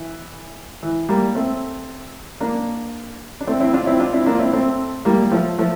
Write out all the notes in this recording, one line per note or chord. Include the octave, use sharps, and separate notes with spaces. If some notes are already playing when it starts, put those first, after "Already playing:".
Already playing: E3
E3
G3 A#3
A3 C4
A#3 D4
D4
A3 C4
C4 E4
D4 F4
C4 E4
D4 F4
C4 E4
A#3 D4
F4
C4 E4
A3 C4
G3 A#3
G3
F3 A3
F3 A3